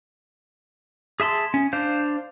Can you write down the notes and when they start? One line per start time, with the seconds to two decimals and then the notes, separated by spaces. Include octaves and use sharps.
1.20 G#4 E5 A5 C6
1.54 C#4
1.73 D4 C5 F5